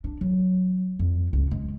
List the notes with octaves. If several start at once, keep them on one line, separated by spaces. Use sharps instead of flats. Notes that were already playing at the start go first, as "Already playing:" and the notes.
D4
F#3
F2
C#2
G#3